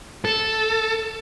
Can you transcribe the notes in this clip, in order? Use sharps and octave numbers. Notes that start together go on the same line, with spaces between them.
A4